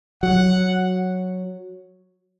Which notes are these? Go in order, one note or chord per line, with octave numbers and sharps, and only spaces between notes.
F#3 F#5